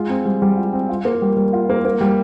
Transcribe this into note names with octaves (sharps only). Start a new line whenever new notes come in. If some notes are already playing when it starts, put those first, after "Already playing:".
Already playing: G#3 F4
C4
G3
G3
F4
C4
F4
A#3
G3
G3
F4
A#3
A#3
G3